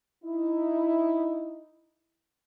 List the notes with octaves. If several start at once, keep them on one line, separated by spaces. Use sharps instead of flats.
D#4 E4